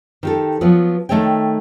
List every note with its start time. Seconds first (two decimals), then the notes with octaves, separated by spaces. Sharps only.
0.23 D#3 G4 A4
0.61 F3 F#3 B3
1.09 D#3 A3 A4 C#5 G5